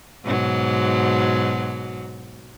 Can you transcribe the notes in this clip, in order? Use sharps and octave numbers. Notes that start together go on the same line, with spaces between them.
G#2 B2 F#3